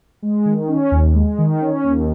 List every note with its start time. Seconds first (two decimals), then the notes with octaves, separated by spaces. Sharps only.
0.22 G#3
0.46 D#3
0.68 C#4
0.91 D#2
1.14 G#3
1.38 D#3
1.62 C#4
1.84 D#2